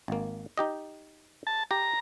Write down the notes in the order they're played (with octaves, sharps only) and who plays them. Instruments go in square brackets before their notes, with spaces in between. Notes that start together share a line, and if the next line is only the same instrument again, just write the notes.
[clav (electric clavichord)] G#1 A#3
D#4 G4 D#5
[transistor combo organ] A5
[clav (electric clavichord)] G4 [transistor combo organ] A#5